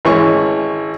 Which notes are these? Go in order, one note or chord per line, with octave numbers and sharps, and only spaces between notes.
G#1 E3 C#4 C#6